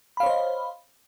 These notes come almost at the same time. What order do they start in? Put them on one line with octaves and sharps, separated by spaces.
B5 F5 C#5 C5 D#5